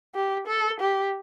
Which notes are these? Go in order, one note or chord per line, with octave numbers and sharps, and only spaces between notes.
G4
A4
G4